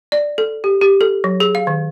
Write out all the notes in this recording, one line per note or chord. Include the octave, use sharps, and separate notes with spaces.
D5
A4
G4
G4
A4
F#3
G#4
F5
D#3